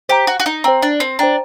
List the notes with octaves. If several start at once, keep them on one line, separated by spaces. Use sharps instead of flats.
G4 C5 G5 A#5
F#4
F#4
D#4
C4 C5 G5 A#5
D4
C4
D4 C5 G5 A#5